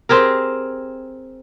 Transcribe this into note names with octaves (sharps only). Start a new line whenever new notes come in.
C4 G4 G#4 A#4